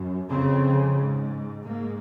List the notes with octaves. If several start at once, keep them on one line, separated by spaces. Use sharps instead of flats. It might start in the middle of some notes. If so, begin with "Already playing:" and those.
Already playing: F#2
F2 C#3 C4
G#2
G#2 A#3